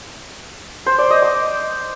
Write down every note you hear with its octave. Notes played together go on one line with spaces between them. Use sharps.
C5
D5
D#5
D6